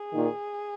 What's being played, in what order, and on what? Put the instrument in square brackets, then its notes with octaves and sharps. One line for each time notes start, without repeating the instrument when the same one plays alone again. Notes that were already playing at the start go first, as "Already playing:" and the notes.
Already playing: [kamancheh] G#4
[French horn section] A#2 D#3